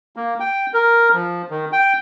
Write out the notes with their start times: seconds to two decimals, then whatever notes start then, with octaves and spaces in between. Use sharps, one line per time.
0.16 A#3
0.40 G5
0.74 A#4
1.14 F3
1.50 D#3
1.72 G5